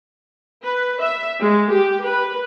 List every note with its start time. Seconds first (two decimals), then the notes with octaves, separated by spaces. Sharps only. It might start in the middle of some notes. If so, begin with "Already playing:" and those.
0.62 B4
1.01 E5
1.40 G#3
1.71 G4
2.04 B4